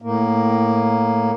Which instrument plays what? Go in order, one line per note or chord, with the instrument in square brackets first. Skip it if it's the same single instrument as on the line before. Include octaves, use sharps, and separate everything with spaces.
[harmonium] A2 A#3